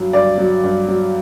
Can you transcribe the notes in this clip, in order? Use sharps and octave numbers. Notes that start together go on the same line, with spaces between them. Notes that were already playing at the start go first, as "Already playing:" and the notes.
Already playing: G2 F#3
G2 D5
F#3
G2
F#3